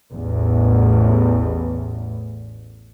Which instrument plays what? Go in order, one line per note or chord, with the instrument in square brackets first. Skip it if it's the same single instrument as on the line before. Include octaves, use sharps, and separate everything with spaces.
[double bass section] A1 E2